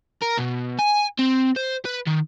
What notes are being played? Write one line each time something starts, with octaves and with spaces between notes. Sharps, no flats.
A#4
B2
G#5
C4
C5
B4
D#3